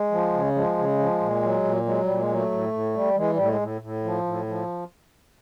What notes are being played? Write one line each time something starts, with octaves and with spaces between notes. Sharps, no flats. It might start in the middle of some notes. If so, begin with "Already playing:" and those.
Already playing: G#3
F3
C#3
F3 G#3
C#3
F3
A#2
F#3
A#2
F#3 G#3
A#2 G3
G#3
F#3
A3
A2
A2
G3
E3 G#3
A2 G3
A3
G#3
A2
A2
F3
A2
F3